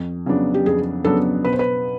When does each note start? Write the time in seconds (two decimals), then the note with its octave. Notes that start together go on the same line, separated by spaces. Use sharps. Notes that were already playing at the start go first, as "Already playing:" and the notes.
Already playing: F2
0.26 C#3 F#3 B3 D4
0.54 G4
0.66 F2 G#4
1.04 C#3 F#3 B3 D4 A4
1.45 B2 B4
1.53 C5
1.59 B4